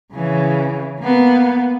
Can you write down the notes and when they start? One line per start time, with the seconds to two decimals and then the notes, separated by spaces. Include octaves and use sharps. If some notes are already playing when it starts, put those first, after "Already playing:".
0.13 C#3 E3
1.00 A#3 B3